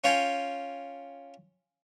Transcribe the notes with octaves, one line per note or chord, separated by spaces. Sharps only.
C#4 F4 C#5 G5 G#5